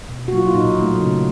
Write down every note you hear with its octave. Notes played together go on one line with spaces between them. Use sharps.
B2
F#4
F#3 A#3 F4
E4
A#2 D#4
F#3 A3
C#3